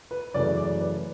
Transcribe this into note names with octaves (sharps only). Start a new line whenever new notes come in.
B4
F#2 C#3 E3 A3 D5
D5
B4